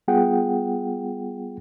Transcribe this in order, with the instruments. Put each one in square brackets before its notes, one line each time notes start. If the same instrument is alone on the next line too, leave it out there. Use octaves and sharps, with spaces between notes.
[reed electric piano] G3 B3 F4 G#4 F#5 G5